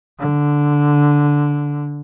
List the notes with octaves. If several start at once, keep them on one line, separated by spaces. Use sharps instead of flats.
D3